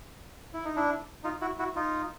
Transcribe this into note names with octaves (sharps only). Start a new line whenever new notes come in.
E4
D#4
D4 E4
D#4 F4
E4 F#4
E4 F#4
D#4 F4